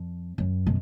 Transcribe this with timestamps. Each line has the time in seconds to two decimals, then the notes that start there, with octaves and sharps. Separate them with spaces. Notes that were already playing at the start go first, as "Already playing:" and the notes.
Already playing: F2
0.38 F#2
0.67 B2